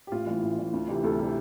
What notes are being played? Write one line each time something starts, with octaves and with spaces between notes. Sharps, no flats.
G4
A1 F4
A2 E3
A1
A2 E3
D2
C3 E3
D2 A4
C3 E3 A4